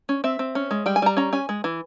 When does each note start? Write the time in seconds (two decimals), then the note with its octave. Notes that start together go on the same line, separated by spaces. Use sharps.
0.09 C#4
0.24 C4 E5
0.39 C4
0.55 C#4
0.71 G#3
0.86 G3 G5
0.96 G#5
1.02 G3 A#5
1.17 C#4 A#5
1.33 C#4 G#5
1.49 G#3
1.64 E3